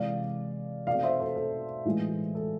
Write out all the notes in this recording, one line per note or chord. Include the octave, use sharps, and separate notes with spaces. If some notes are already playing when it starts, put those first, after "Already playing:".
Already playing: C3 E3 G#3 D5 F5
B2 A3 C4 D5 F5
C5 E5
A4 C5
A4
A2 E3 G#3
A4